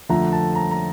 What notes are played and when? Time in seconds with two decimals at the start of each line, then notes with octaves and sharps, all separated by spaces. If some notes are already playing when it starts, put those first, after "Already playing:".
0.09 F2 D3 F3 A3 A#5
0.32 A5
0.55 A#5
0.71 A#5